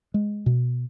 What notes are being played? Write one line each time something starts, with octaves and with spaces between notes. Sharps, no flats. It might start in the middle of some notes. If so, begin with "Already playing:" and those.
G#3
B2